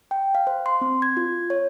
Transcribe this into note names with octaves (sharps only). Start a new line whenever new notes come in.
G5
F5
C5
C6
C4
G#6
F4
C#5